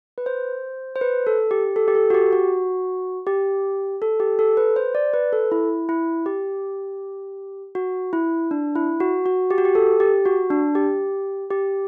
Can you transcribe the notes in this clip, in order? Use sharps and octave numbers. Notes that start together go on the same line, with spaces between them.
B4
C5
C5
B4
A4
G4
A4
G4
A4
F#4
G4
F#4
G4
A4
G4
A4
B4
C5
D5
B4
A4
E4
E4
G4
F#4
E4
D4
E4
F#4
F#4
G4
F#4
G4
A4
G4
F#4
D4
G4
G4